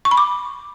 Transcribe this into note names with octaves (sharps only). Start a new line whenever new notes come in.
C#6
B5
D6